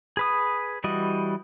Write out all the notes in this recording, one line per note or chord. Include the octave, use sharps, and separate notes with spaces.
G#4 B4 D#6
E3 G3 F#4 D#5